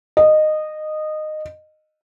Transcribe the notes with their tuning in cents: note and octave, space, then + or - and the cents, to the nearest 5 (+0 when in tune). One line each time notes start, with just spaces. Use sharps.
D#5 -15